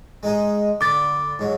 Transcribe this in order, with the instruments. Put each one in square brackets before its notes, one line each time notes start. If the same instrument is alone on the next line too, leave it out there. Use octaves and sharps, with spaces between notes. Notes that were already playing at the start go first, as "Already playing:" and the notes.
[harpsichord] G#3 D#4 G#4
[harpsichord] D3 B5 [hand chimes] D6 A6
[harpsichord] G#2 F#3